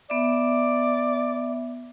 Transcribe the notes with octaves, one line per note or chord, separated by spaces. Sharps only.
B3 D5 E5